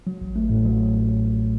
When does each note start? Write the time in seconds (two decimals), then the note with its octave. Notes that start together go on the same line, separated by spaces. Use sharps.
0.07 F#3
0.21 A1
0.36 A3
0.50 A2
0.65 F#3